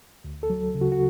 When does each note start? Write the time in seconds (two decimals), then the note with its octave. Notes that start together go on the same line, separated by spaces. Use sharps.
0.24 D2
0.43 A4
0.50 F#3
0.75 C#3
0.81 F#4
0.92 F#4